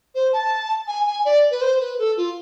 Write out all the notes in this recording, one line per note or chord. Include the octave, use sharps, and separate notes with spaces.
C5
A5
G#5
G#5
D5
B4
C5
B4
A4
F4